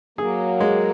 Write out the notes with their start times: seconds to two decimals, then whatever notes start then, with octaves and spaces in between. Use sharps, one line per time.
0.18 F#3 A#3 G#4
0.60 G#3